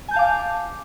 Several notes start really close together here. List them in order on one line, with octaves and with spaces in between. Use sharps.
G#5 G6 A5 F5 D6